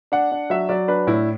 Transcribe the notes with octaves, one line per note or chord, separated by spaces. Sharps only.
D4 F#5
D4
F#3 E5
F#3 D5
D4 B4
A2 E4